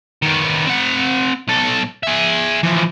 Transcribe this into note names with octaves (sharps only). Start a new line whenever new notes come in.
D#3 B3
C4 F#5
B1 A4
G#4 E5
E3 F3